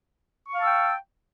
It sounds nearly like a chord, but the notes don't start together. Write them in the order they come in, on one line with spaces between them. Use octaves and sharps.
C#6 F5 A5 E6 G5